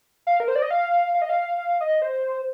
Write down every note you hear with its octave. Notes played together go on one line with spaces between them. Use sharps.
F5
A#4
C5
D5
D#5
F5
F5
D#5
F5
F5
D#5
C5